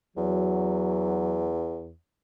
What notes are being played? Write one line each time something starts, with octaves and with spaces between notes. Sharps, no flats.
E2 F#3